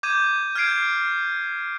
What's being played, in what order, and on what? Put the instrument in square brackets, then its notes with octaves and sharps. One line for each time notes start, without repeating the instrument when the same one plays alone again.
[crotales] D6 G6 G#6 D#7 E7
F6 G6 G#6 C7 D7